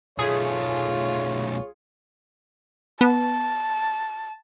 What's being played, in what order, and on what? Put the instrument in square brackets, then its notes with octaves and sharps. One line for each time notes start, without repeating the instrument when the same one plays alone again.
[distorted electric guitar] B1 A3 [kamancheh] F4 [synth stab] G#4 [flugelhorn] C#5
[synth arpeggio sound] B3 [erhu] A5